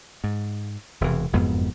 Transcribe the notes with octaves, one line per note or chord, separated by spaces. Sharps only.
G#2
E1 C3 E3
F#1 F2 G#2 B3